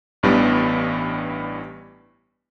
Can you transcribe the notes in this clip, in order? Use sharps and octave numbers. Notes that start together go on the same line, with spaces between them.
A1 G2 E3 G3 B3